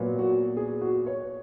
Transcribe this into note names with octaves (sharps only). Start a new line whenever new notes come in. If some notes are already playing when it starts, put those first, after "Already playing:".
Already playing: A#2 F#3 B3
F#4
G#4
F#4
C#5